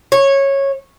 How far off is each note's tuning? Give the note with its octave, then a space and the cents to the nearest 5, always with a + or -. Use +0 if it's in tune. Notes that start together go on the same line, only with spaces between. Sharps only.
C#5 -15